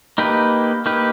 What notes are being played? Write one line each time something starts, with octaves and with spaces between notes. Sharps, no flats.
A#3 D#4 G4 B4
A#3 D#4 G4 B4